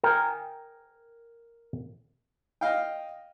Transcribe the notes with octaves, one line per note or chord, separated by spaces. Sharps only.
A#4 G5 G#5
D#5 F5 G5